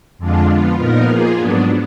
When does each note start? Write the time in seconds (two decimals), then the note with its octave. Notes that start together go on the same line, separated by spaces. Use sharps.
0.18 F2 D3 G#3 D4 F4
0.48 F3 B3 F4
0.77 A#2 F3 B3 D#4 A#4
1.06 F3 A#3 F4 G#4
1.36 G#2 F#3 B3 D4